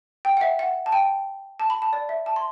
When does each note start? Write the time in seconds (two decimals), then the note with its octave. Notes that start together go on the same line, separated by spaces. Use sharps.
0.25 G5
0.37 F#5
0.41 E5
0.59 F#5
0.86 A5
0.92 G5
1.60 A5
1.70 B5
1.82 A5
1.93 D5
2.09 E5
2.26 A5
2.36 C6